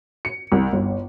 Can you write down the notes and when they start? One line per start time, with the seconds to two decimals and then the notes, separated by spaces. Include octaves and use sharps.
0.25 C#7
0.52 C2
0.73 G1